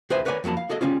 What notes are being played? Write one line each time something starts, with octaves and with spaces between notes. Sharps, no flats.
C#2 G#4 B4 C5 E5 G#5
A#4 B4 C#5 D5 F5 G#5
F2 F#3 A#3 A5 B5
F5
F#4 G#4 A4 D#5
C#3 G3 A#3 C#4 F4